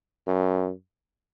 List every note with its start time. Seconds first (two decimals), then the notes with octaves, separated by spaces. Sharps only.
0.27 F#2